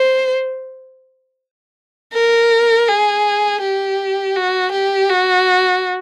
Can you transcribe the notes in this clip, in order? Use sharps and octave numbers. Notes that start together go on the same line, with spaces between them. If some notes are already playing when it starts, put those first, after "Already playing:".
Already playing: C5
A#4
G#4
G4
F#4
G4
F#4